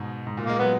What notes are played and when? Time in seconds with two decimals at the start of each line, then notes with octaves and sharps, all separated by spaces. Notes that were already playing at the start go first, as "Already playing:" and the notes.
Already playing: G#2 B2
0.27 G#2
0.37 A#2
0.46 G#3 A#3
0.59 F#3 B3